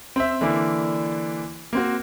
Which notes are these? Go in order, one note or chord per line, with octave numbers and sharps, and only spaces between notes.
C4 C5 E5
D3 E3 A#3 D4 E4
A#3 C4 F#4